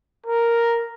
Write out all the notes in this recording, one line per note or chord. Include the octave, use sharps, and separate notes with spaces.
A#4